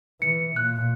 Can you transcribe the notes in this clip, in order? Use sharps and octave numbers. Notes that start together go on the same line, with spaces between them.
E3 C#7
A#2 F#6